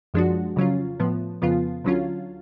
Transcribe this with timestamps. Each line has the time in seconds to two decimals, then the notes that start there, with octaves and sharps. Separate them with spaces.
0.14 F#2 F3 G#3 D4 F#4
0.56 F2 C#3 F#3 C#4 F4
1.00 A2 F3 B3
1.42 F2 C#3 F3 B3 F4
1.84 D2 D3 F#3 C#4 F4